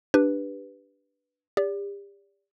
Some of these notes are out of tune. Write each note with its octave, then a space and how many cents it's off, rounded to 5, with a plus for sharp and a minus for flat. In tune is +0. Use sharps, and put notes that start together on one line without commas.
D4 +0 G4 +0 B4 +0
G4 +35 D5 -30